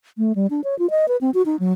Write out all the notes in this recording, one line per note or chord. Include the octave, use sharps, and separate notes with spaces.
A3
G3
D4
C#5
F4
D#5
B4
C4
F#4
D#4
F#3